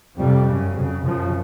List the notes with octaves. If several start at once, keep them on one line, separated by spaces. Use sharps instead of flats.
F2 C3 G3
F#2 C#3
F2 C#3 F#3
F#2 C#3 F3